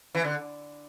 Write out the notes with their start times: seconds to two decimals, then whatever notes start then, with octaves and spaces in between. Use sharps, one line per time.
0.15 E3
0.24 D3